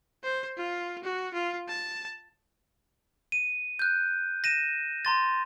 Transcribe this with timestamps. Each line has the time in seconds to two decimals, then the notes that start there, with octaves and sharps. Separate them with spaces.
0.24 C5
0.57 F4
1.03 F#4
1.34 F4
1.69 A5
3.32 D#7
3.79 F#6 G6
4.44 A#6 D#7 E7
5.05 A#5 C6 A6